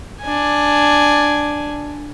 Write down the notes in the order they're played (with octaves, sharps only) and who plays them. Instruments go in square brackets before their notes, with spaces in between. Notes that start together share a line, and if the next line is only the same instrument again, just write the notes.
[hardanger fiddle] D4 G#5